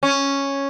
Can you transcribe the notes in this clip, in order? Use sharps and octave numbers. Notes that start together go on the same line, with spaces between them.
C#4